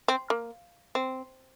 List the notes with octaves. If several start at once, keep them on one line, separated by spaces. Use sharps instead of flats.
C4
A#3
C4